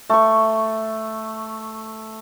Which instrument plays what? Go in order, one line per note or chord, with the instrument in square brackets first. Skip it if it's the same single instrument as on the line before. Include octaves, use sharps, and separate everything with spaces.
[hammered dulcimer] A3 C#6